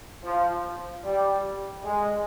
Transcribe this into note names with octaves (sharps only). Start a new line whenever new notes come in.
F3
G3
G#3